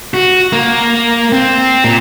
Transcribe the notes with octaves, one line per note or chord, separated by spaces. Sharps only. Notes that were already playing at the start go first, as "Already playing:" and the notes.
F#4
A#3
C4
A#2